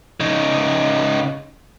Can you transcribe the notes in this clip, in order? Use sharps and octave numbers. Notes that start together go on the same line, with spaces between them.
C#3 D#4